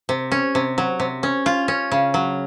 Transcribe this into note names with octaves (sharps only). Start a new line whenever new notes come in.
C3
C#4
C3
F#3
C3
C#4
F4
C#4
C#3
F#3